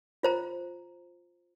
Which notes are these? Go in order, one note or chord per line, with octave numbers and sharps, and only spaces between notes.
F4 C5 A#5